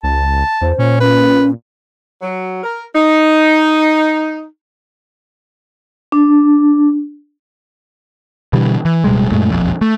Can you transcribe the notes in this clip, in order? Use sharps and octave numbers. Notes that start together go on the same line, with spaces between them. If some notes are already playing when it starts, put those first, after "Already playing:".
C#2 A5
E2 C5
A#2 C#4
C#4 B4
F#3
A#4
D#4
D4
B2 D3 E3 G3
E3
D1 B2 G3 G#3
F#2 A#2 G#3 A3
E1 A#1 F2
A3